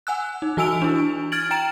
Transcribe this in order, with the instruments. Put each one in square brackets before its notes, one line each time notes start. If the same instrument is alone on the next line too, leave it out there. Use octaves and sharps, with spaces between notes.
[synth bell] F#5 G#5 E6 F#6
D#4
E3 F#4 G#5 E6 D7 F7
D4 E4
F6 G#6 A6 D7 F#7
G5 A#5 A6 D7 E7